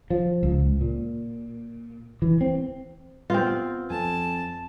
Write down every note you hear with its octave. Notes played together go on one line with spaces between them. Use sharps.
F3
C#2
A#2
E3
C4
B3 C4 F4
F2 G#5 A5